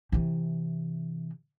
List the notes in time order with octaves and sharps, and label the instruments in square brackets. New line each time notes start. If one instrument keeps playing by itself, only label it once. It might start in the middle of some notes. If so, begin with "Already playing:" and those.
[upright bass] C3 E3